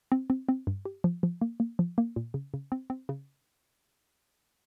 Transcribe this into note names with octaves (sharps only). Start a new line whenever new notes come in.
C4
C4
C4
G2
G4
F3
F3
A#3
A#3
F3
A#3
A#2
C#3
C#3
C4
C4
C#3